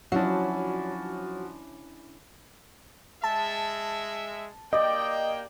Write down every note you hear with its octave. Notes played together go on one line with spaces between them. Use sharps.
F3 F#3 C#4 D4 E4 F#4
G#3 E5 A5
A#3 G4 D5 D#5 G5